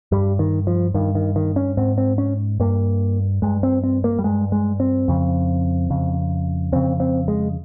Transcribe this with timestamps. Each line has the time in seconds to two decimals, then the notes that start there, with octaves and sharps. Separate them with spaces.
0.12 G2 G3
0.39 D#3
0.67 F3
0.94 G2 D#3
1.15 D#3
1.36 D#3
1.56 C#4
1.77 G#2 C4
1.98 C4
2.18 C#4
2.60 G2 A#3
3.42 G2 G#3
3.63 C4
3.84 C4
4.04 A#3
4.19 G3
4.24 G2 G#3
4.52 G#3
4.80 C4
5.08 F2 C#3
5.90 F2 C#3
6.72 F2 C#3 C4
7.00 C4
7.28 G#3